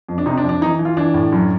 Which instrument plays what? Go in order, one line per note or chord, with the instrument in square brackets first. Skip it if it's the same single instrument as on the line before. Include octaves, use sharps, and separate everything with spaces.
[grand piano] F2
D4
C3 D#4
D4
F2
D4
E3 D#4
E3
F4
E3 D4
A2
F#2